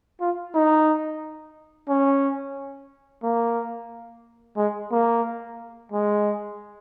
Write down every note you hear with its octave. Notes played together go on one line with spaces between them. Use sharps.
F4
D#4
C#4
A#3
G#3
A#3
G#3